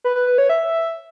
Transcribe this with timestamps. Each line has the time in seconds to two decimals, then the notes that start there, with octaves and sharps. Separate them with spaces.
0.04 B4
0.16 B4
0.27 B4
0.38 C#5
0.49 E5